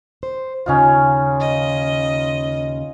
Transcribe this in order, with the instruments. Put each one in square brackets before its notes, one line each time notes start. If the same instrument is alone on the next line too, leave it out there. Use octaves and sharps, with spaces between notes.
[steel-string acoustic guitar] C5
[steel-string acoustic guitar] D#2 C#3 [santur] C#4 D#4 F4
[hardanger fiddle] D#5